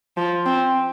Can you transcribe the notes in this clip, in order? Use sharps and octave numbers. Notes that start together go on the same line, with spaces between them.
F3
C4